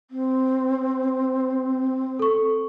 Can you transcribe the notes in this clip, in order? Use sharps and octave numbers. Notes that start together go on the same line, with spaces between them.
C4
A4 C#6